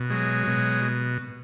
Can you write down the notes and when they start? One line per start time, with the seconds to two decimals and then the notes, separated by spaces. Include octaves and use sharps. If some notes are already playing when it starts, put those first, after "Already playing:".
Already playing: B2
0.10 F#3 G#3
0.47 B2